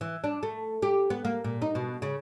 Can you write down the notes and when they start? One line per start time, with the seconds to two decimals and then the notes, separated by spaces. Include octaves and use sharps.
0.01 E3
0.24 D4
0.43 A3
0.82 G4
1.10 B3
1.25 A#3
1.44 A#2
1.62 D#4
1.75 B2
2.02 C#3